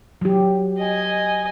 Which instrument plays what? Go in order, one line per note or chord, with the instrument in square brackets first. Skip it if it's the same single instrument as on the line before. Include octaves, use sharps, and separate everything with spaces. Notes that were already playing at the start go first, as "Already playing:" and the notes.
[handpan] F#3 G4
[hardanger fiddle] D#5 G#5